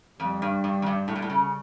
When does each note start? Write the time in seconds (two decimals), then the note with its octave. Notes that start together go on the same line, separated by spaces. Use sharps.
0.20 F2 G3
0.42 G2
0.64 G2
0.82 F2
0.86 G2
1.08 A2
1.16 A#2
1.22 A2
1.30 C#3